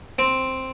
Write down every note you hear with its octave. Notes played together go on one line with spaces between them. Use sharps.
C4